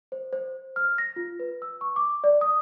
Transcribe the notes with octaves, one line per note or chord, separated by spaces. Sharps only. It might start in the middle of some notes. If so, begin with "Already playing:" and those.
C5
C5
F6
A#6
F4
B4
E6
C#6
D6
D5
D#6